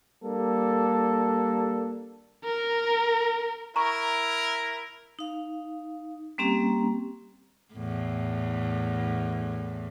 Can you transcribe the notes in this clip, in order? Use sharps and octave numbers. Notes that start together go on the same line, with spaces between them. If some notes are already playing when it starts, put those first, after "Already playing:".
G3 A#3 D4 A4
A#4
E4 A#4 A#5 C#6
D#4 F5
G3 A#3 C4 C#4 G4 A#5
E2 A2